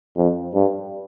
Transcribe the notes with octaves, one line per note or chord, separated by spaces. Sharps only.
F2
G2